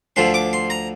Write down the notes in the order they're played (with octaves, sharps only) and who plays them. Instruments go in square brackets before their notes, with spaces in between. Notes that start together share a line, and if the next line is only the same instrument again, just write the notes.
[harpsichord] D2 D3 F3 C6
D6
C6
A#5